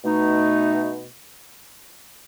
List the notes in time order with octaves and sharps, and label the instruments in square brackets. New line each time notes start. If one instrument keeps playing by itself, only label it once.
[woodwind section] B2 A3 D#4